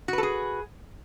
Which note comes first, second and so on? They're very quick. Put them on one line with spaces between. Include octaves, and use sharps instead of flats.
F#4 B4 A4 G#4